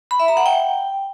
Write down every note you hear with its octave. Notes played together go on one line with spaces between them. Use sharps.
B5
E5
A#5
F#5
G5